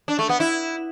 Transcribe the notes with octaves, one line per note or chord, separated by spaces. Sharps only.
D4
A3
B3
E4